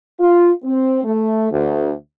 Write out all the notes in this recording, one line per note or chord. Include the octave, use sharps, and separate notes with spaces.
F4
C4
A3
D2